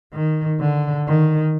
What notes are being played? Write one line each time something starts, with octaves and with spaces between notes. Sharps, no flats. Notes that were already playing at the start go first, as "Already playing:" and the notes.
D#3
D3
D#3